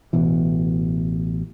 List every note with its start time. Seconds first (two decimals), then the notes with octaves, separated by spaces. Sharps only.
0.13 A1 B2 E3